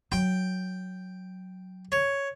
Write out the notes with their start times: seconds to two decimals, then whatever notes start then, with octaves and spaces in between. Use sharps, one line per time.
0.12 F#3 G5
1.92 C#5